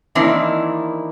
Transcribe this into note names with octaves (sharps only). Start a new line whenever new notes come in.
D#3 E3 A#3 C4 D4 E4